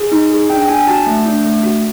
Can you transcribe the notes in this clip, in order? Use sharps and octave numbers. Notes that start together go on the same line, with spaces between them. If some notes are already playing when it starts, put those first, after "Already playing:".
Already playing: G#4
D#4
G#4
D4 G5
G5
D4 G#5
F#4 A5
A3
D4
A3
F#4